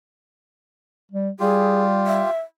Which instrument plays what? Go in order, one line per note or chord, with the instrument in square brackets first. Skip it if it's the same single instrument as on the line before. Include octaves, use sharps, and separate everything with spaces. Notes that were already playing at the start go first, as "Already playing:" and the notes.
[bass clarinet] G3
[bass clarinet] G3 [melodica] F4 G4 [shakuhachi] G#4
[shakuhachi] E5